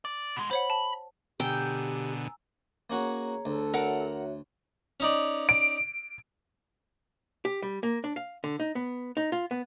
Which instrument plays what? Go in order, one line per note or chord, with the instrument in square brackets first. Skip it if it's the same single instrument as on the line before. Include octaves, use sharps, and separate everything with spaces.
[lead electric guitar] D5
B2 G#3
[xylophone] C5 C#5 F#5 [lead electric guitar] B5
[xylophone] A5
[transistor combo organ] B2 D3 [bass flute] G4 [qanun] G5 [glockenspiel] G#5 A#5 E6
[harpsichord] A#3 C#4 F#4 [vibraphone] G#4 C#5 A#5
[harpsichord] D2 [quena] A4
[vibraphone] F#4 C#5 E5 [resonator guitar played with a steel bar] A#4 F#5
[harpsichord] C#4 D#4 D5
[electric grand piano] D7
[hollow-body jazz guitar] G4
G3
A#3
D4
F5
D3
D#4
B3
D#4
F4
B3